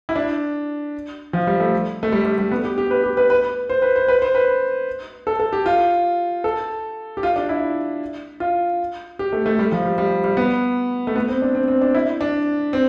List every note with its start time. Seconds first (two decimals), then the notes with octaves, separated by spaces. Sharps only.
0.09 E4
0.15 D4
1.33 F3
1.47 G3
1.60 A3
2.03 A3
2.12 G3
2.25 G3
2.38 G3
2.51 B3
2.64 G4
2.78 G4
2.91 B4
3.04 G4
3.17 B4
3.30 B4
3.69 C5
3.82 B4
3.96 C5
4.08 B4
4.22 C5
4.35 B4
5.27 A4
5.40 A4
5.53 G4
5.66 F4
6.44 A4
7.17 G4
7.23 F4
7.36 D4
7.49 E4
8.40 F4
9.19 G4
9.33 A3
9.46 A3
9.59 G3
9.72 F3
9.85 G3
9.98 G3
10.24 G3
10.37 B3
11.07 A3
11.16 B3
11.29 C4
11.42 D4
11.55 C4
11.68 C4
11.81 D4
11.95 E4
12.21 D4
12.73 C4